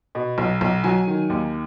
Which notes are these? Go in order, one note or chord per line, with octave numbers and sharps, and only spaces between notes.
B2
B1
B1
F#3 G#5
D#3
D#2